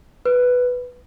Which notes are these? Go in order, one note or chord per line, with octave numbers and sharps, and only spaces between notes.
B4